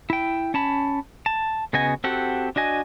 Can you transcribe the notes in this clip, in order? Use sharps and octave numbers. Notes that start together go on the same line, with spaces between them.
E4 G5
C#4 A5 B5
A5
C#3 B3 F#4 D#5 G#5
C4 F#4 G4 A4 F#5
D4 F#4 D#5 G#5